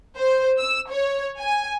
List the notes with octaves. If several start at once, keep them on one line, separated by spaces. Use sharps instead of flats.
C5
E6
C#5
G#5